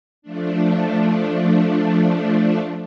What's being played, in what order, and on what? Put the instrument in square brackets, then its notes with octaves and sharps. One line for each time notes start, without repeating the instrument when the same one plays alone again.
[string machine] F3 A3 D4